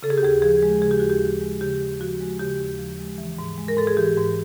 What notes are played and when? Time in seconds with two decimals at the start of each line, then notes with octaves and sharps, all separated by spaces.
0.03 C#3 A4
0.10 G#4
0.18 G4
0.23 D#2 G#4
0.42 F3 G#4
0.63 G#3
0.82 C#3 G#4
0.91 G4
1.00 D#2 F#4
1.10 G4
1.21 F3
1.41 G#3
1.61 C#3 G4
1.81 D#2
2.00 F3 F#4
2.20 G#3
2.39 C#3 G4
2.59 D#2
2.79 F3
2.99 G#3
3.18 E3
3.38 G#2
3.58 G#3
3.68 A#4
3.77 G#2 A4
3.87 G#4
3.97 E3 G4
4.17 G#2